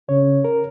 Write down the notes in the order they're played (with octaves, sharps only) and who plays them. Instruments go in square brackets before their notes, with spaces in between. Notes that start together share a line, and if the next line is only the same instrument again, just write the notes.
[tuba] C#3 [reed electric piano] C#5
[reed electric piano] A#4